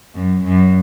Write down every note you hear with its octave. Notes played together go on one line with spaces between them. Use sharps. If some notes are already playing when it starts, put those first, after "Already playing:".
F#2
F#2